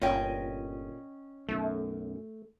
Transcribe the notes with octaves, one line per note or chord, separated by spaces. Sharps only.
G1 A#2 C#4 D#5 G5
B1 F#2 A3